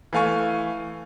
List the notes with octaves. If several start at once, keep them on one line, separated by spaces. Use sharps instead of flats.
E3 A3 F5 G#5 C#6